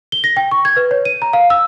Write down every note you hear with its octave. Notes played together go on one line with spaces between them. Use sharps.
G7
A#6
G5
C#6
G#6
B4
C#5
D#7
A#5
F5
E6